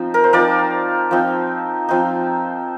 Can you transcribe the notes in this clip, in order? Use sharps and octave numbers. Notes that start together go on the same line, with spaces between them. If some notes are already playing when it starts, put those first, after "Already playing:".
Already playing: F3 C4 D#4
A#4
C5
F3 C4 D#4 A#4 D5
F3 C4 D#4
F3 C4 D#4